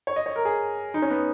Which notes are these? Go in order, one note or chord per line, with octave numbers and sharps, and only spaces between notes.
C#5
D#5
C#5
A#4
G#4
D#4
C#4
B3